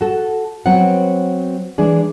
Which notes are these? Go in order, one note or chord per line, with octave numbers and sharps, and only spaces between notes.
F#4 A4
F#3 B3 C4 F#5
E3 G#3 D4 G#4